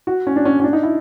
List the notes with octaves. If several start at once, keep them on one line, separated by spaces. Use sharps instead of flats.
F#4
C#4
D4
C#4
C#4
D4
D#4
E4